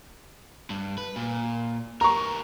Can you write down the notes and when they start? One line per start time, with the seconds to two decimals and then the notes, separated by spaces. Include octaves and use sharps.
0.70 G2
0.98 B4
1.16 A#2
2.01 G4 A#4 A#5 C#6